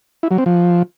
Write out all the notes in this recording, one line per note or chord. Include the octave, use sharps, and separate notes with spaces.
E4
F#3
C4
F3